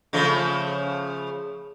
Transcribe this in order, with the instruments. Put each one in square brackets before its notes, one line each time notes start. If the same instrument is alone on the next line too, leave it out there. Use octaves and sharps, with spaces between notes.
[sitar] C#3 F3 A3